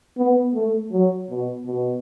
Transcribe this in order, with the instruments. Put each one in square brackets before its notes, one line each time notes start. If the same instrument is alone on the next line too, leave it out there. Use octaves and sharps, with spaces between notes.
[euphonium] B3
A3
F#3
B2
B2